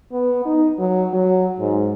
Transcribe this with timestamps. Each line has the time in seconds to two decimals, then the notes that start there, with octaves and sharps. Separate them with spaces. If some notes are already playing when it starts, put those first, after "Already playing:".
0.12 B3
0.46 D#4
0.79 F#3
1.13 F#3
1.60 G#2